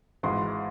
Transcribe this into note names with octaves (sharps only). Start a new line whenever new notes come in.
G#1 G#2 E3 C6